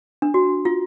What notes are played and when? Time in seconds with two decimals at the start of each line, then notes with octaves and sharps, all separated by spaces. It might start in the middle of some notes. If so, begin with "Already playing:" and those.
0.22 D4
0.34 F#4
0.65 F4